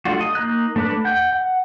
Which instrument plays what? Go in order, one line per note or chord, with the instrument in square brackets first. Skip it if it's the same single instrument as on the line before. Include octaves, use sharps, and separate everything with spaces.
[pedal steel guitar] G3 A3 D4 F4 F#4
D#5
A#3 D#4 F#6
A3 D4 B4 D6 F#6
F#5 G5 G6
F#5